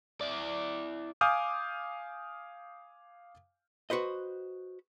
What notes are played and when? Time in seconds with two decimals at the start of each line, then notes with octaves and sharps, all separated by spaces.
0.21 E4 D5
1.21 F5 G#5 D6 D#6 F6 G6
3.90 F#4 B4 C5 D#5